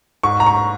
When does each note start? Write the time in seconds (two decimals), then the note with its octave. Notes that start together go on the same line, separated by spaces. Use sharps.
0.23 G#2 C#6
0.40 A#5
0.46 C#6